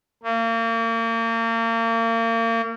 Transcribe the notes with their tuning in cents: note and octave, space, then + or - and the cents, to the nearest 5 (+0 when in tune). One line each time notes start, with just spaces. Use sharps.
A#3 -35